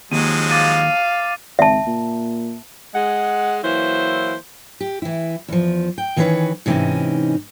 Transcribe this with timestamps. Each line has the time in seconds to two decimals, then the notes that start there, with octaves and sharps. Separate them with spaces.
0.12 D#2 F3 F#3 G#3 D#7
0.51 F5 D6 A6 D#7
1.59 G#1 E5 A5
1.87 A#2
2.95 G#3 F#5
3.63 E3 F#3 A#3 E4 C5
4.80 G4
5.02 E3 E4
5.48 E2 F3
5.98 G5
6.17 D#3 E3 C#4 A4 B4 C#5
6.66 G#2 C3 E3 G#3 C#4 D#4